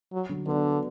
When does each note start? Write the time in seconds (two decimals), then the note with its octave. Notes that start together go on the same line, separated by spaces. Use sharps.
0.13 F#3
0.29 D3 F#3
0.47 D3 B3 D4